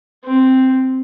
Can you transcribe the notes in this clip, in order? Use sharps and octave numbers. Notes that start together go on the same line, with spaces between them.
C4